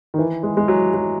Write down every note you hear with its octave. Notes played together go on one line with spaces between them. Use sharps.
D#3
E3
G#3
G#3
F#3
F#3